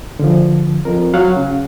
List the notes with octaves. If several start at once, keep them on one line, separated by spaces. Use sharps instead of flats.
D3 F3
F2 A#4
F#3 F5 F#5
C#3